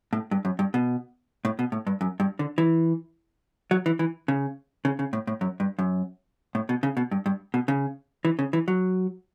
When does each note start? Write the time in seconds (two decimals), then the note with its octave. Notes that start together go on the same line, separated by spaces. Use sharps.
0.13 A2
0.31 G2
0.45 F#2
0.59 G2
0.74 B2
1.45 A2
1.59 B2
1.72 A2
1.87 G2
2.01 F#2
2.20 G2
2.39 D3
2.58 E3
3.71 F#3
3.86 E3
3.99 E3
4.28 C#3
4.85 C#3
4.99 C#3
5.13 A2
5.27 A2
5.41 F#2
5.60 G2
5.79 F#2
6.55 A2
6.69 B2
6.83 C#3
6.97 B2
7.11 G2
7.26 G2
7.54 B2
7.68 C#3
8.25 E3
8.39 C#3
8.53 E3
8.68 F#3